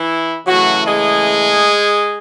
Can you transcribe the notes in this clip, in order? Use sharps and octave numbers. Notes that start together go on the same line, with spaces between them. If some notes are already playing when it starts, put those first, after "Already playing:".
Already playing: E3 E4
C#3 E3 F#3 A3 F#4
G#3 G#4